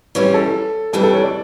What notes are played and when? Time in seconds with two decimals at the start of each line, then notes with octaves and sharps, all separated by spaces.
0.15 E3 G3 C#4 F4 C#5
0.34 A4
0.93 F2 E3 G3 D4 A4
1.03 A4
1.13 C#5
1.22 D5